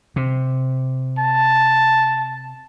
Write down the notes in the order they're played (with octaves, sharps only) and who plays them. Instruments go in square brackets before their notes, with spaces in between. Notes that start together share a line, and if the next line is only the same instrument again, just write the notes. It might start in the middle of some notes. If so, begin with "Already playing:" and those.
[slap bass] C3
[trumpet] A5